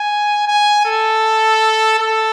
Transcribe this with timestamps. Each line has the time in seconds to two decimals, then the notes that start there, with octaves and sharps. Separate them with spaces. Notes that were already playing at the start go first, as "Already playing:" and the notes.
Already playing: G#5
0.47 G#5
0.86 A4
1.99 A4